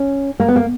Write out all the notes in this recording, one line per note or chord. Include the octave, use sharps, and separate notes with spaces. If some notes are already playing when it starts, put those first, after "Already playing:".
Already playing: C#4
A#3
B3
A#3